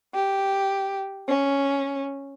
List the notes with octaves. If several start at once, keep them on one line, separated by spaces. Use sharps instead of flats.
G4
C#4